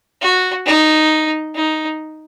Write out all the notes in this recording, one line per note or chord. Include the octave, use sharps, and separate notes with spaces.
F#4
D#4
D#4